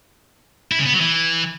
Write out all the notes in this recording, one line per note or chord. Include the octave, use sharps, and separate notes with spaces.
E4
C#3
B3
F#3
E3